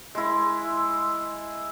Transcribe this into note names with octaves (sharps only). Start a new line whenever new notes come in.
G#3 E4